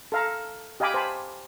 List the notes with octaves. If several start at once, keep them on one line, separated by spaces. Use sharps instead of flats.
A4 F5 A#5
G4 D#5 F5 G#5 B5 D6
C5 G#5 A5 B5